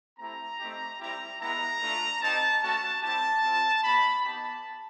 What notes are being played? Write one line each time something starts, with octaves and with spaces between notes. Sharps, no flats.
A3 C4 E4 G4 A#5
A3 C4 D#4 G4
G3 C4 E4 G4 A#5
G#3 B3 E4 A#5
A3 D4 F4
C4 D#4 G4 A5
A3 C#4 F#4 A5
G3 C4 E4 G4 A5
C4 F4
A#3 D#4 G4 B5
B3 D#4 G4 A5